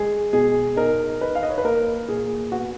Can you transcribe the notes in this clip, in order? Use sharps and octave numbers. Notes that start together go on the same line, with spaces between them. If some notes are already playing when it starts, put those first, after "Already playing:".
Already playing: G#3 G#4
B2 G#4
D#4 A#4
D#4 B4
F5
D#5
C#5
B4
A#3 A#4
A#2 G#4
B3 F#4